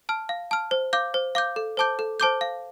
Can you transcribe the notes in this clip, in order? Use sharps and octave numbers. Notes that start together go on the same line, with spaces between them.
A5 F6
F5
A5 F6
C5
F5 D6 G6
C5
F5 D6 G6
A4
C5 A5 D6 G6
A4
C5 A5 D6 G6
F5